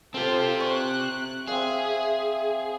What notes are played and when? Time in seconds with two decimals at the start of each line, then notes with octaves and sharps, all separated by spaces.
0.14 C4 F4 G4 A4 C5
0.60 C#6 F#6
1.48 C4 G#4 E5 F5